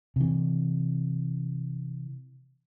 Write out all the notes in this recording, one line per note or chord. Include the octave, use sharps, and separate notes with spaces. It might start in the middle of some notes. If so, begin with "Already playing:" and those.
C3 E3